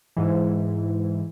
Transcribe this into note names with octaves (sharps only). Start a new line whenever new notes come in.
G#2 E3